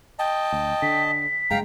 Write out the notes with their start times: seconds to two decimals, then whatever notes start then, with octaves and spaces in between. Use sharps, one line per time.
0.19 D#5 G5 A5
0.52 D2
0.82 D3 B6
1.51 F#1 G2 G#3 F5 G5 A#5